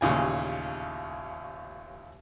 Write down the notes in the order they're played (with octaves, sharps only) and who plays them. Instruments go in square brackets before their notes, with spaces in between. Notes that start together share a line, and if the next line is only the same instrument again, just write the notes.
[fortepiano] A1 D#2 A#2 C#3 G#5